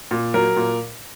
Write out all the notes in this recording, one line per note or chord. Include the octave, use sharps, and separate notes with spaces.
A#2
F#3 A#4
A#2